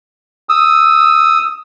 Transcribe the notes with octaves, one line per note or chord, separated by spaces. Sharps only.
D#6 E6